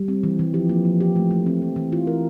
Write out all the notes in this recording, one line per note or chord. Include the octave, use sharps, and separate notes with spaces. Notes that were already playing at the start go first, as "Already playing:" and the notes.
Already playing: G3
C4
E3
E3
F3 G4
A#3
A#3
G4
A3
A3
C4
E3
E3
E3 F4
A#4